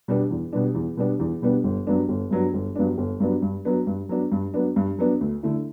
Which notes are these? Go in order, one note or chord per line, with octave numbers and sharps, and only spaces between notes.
B2 G3 B3 D4
E2
B2 G3 B3 D4
E2
B2 G3 B3 D4
E2
B2 G3 B3 D4
G1
G2 F#3 B3 D4
G1
G2 F#3 B3 D4
G1
G2 F#3 B3 D4
G1
G2 F#3 B3 D4
G2
F#3 B3 D4
G2
F#3 B3 D4
G2
F#3 B3 D4
G2
F#3 B3 D4
D2
D3 A3 E4